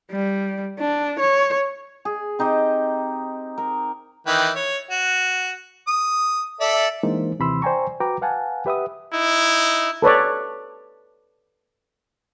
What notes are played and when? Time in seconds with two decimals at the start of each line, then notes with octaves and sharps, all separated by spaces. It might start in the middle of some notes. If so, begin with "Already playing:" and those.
0.11 G3
0.78 D4
1.20 C#5
2.05 G#4
2.39 C4 D#4 G4 C5
3.58 A#4
4.27 D#3 E3 G5
4.56 C#5
4.91 F#4
5.88 D#6
6.60 A4 D5 E5
7.03 E3 G#3 A#3 D4 D#4 C5
7.39 D#2 C3 E3 B5 C6 E6
7.62 C5 D5 G5 G#5 A#5 C#6
8.00 F#4 B4 G5 A#5 D6
8.21 B4 F5 F#5 G#5 A5
8.66 G4 B4 E5 F#5 D#6
9.14 D#4 E4
10.02 A4 B4 C#5 D5